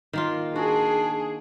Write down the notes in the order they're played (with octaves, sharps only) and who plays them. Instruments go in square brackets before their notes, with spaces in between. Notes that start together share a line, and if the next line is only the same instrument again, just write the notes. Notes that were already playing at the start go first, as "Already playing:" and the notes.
[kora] D#3 A#3 F4
[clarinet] D4 [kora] F#4 [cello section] G#4